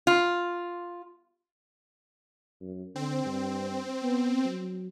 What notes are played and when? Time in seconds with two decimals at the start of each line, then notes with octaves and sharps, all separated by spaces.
0.07 F4
2.61 F#2
2.96 D3 C4
3.25 G2
4.03 B3
4.45 F#3